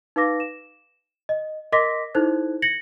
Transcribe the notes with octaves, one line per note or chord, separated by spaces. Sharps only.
D#4 B4 F5 D6 A#6
E7
D#5
A#4 D#5 C6 D6 A#6 B6
D#4 E4 A4 C5 F#6 G#6
G#6 A#6 C#7 F#7